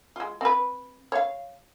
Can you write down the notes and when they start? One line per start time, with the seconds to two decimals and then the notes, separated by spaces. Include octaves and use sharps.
0.16 G#3 F4
0.41 C4 B4
1.12 C#5 F5